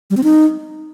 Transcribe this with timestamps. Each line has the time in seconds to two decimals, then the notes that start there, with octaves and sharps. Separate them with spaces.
0.10 G3
0.17 C4
0.23 D#4